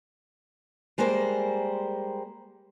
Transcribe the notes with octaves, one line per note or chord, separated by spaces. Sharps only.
G3 G#3 A#3 A#4 C5